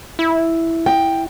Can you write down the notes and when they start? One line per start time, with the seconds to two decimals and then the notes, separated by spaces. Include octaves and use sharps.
0.19 E4
0.86 G5